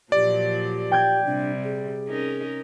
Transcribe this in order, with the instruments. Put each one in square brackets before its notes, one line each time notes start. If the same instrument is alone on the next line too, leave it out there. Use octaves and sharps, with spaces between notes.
[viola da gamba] A#2 F3 F#3 [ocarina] G4 [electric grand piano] D5
[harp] G5 G6 G#6
[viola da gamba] C3 G3 [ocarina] D4
[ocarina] G#4
[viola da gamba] C#4 D#4 A#4